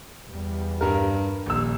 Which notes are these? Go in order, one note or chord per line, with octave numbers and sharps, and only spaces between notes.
E2 G3
G2 A#4
D#1 A#1 E6